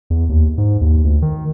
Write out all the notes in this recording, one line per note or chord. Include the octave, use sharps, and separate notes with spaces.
E2
D#2
G#2
D#2
D2
D#3